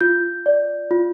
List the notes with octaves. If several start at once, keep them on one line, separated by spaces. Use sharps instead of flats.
F4 G6
D5
F4